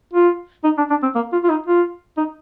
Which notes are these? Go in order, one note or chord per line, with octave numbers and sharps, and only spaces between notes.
F4
D#4
D4
D4
C4
A#3
F4
F4
D#4
F4
D#4